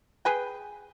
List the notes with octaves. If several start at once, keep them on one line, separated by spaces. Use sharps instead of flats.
G#4 B4 G5